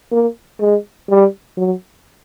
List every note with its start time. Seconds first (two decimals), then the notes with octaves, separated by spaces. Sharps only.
0.12 A#3
0.60 G#3
1.10 G3
1.58 F#3